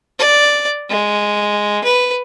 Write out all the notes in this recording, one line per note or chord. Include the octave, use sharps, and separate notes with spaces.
D5
G#3
B4